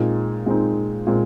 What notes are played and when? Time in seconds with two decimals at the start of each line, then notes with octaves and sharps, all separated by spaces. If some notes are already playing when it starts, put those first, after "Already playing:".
Already playing: A#2 G#3 C4 D#4
0.46 A#2 G#3 C4 D#4
1.07 A#2 G#3 C4